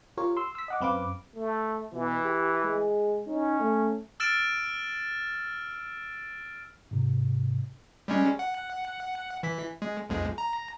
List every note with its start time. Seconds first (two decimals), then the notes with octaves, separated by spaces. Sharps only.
0.17 F4 G4 A#4 C#5
0.37 C6 E6
0.55 E6 B6
0.68 D#5 F#5 D6
0.81 F#2 C4 B4 F5 D6
1.35 A3
1.93 B2 E3
2.25 G4
2.64 G#3
3.27 C#4 D#4
3.60 A3
4.20 E6 F6 A6 D7 E7
6.91 G#2 C3
8.08 G3 G#3 C#4
8.39 F#5
9.43 E3 B6
9.82 G#3
10.09 B1 F2 G#3
10.38 A#5